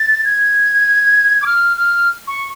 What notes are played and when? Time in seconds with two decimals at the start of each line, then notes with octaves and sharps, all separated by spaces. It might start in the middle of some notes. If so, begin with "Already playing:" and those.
Already playing: A6
0.24 G#6
1.42 D6
1.46 F6
1.77 F6
2.27 C#6